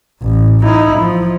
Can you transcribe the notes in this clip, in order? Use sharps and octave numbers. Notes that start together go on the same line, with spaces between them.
A1
D#4 E4
F3